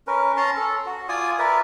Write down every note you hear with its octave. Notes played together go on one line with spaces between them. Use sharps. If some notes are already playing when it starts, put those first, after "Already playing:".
C#4 A#4 B4
C#4 A5 A#5 C6
A4
F#4
F4 D5 G#5 D#6
A#4 B4 D5 E5